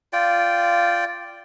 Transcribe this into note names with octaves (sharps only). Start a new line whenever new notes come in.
F4 D5 G5